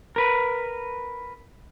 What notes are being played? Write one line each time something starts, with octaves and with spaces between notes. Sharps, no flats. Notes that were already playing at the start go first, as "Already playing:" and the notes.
A#4 B4